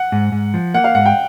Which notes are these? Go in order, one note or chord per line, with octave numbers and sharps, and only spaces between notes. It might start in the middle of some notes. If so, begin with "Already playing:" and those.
Already playing: F#5
G#2
G#2
F3
A#3 F#5
F5
G#2 F#5
G5